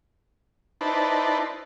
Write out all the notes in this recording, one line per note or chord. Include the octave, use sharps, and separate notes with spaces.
D#4 E4 B4 C5 D5 A5